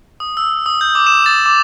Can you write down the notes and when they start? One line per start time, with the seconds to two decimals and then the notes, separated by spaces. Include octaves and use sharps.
0.20 D#6
0.37 E6
0.66 D#6
0.81 G6
0.95 D6
1.07 E7
1.26 A6
1.46 D6